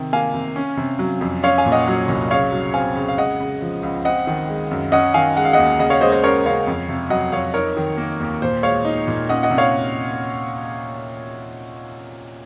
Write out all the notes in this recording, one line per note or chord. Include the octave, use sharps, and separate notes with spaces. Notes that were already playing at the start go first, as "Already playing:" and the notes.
Already playing: C3 D#3
A#3 F5 G#5
C3
C#4
C3
F#3
F2
C#4 C#5 F5
F5 G#5
A#2
D#5 F#5
F#3
C2
C#3 C#5 F5
F#3
C4 F5 G#5
C#3
F5
G#3 D#5 F#5
C#3
F3
C#2
C4 D#5 F#5
D#3
G#3
F#2
C#4 D#5 F#5
D#3 F5 G#5
G#3 F#5
F5
D#2 D#5 F#5
C#3 D#5 F#5
C#5 F5
G#3 C5 D#5
C5 D#5
C#4 A#4 C#5
C#3 C#5 F5
F2
C3
F#3 D#5 F#5
F2 C#5 F5
D#4 A#4 C#5
D#3
A#3
D#2
A#2 C5
G#3 C#5 F5
D#4
A#2
C#4 D#5 F#5
D#5 F#5
C3
C#5 F5